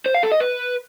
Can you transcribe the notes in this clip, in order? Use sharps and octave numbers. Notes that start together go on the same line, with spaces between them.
C5
F5
A4
D#5
B4